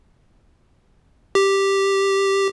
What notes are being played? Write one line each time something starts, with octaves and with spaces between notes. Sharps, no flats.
G4